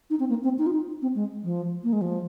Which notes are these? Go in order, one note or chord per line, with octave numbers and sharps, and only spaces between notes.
D#4
C4
A#3
C4
D#4
F4
D#4
C4
G#3
F3
A#3
G#3
F3